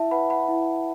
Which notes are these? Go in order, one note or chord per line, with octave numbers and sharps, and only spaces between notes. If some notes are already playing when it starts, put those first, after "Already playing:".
Already playing: E4 E5 A5
B4 F#5 B5
F#5 B5
E4